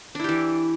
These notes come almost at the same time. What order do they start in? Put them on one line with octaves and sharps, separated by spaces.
D4 E4 G4 E3